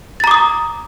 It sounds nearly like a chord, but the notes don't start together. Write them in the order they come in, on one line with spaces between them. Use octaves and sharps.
A6 A#5 D6 D#6